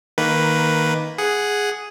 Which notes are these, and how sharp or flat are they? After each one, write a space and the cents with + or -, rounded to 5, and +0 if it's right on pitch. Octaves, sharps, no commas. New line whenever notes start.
D#3 +10 A#3 +0 B4 +0
G#4 +0 F#5 +0